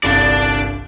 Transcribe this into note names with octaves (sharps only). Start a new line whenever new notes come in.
G1 C2 G2 D4 D5